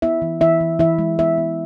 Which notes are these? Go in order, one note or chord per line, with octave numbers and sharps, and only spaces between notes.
B3 E4 E5
E3
E3 E4 E5
E3
E3 E4 E5
G#3
B3 E4 E5
B3